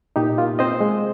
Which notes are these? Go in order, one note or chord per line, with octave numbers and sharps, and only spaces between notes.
A#2 D#4 G4
A#3 F4
C4 C5 D#5
G#3